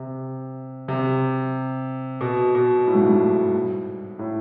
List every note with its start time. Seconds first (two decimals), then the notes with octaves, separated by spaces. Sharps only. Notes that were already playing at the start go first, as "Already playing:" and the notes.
Already playing: C3
0.88 C3
2.21 B2
2.55 B2
2.87 A2
2.94 G#2
3.02 G2
3.09 G#2
4.19 A2